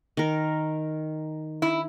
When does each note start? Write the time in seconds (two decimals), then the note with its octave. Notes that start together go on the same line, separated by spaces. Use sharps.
0.17 D#3 A#4
1.62 E4